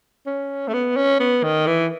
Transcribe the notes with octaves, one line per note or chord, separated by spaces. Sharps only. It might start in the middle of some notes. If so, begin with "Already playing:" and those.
C#4
A3
B3
C#4
B3
D#3
E3